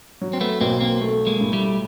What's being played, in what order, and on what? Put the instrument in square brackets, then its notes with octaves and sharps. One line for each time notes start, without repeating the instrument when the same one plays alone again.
[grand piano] F#3
[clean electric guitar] C4
A3 B3
[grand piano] B1 [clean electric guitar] A#3 C4
[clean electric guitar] A#3 C4
[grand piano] A3
[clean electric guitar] G#3 A#3
[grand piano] A2
[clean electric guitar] G3 A3